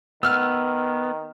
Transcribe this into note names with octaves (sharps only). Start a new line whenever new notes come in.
D#3 B3 E6 F6